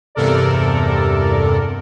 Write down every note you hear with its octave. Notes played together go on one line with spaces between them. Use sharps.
E2 G2 C3 A4 A#4 D5